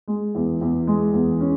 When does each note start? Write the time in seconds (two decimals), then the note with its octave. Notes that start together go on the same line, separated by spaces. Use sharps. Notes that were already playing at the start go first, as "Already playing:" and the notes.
0.08 G#3
0.35 E2
0.61 E2
0.87 G#3
1.13 E2
1.40 C#4